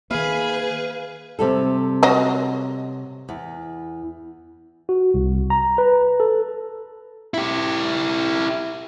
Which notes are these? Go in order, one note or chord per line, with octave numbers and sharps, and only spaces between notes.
D#3 A#3 G#4 B4 F5 G#5
C3 G3 A4
F#3 D#5
E2
F#4
C2
A#5
B4
A4
E4 G4